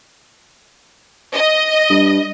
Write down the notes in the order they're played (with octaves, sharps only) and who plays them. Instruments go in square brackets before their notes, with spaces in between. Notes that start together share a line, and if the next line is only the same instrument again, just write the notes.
[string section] D#5
[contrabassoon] G2